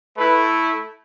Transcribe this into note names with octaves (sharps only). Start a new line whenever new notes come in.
A3 E4 B4